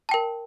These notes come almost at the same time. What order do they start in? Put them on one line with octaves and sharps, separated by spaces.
A5 G5 A#4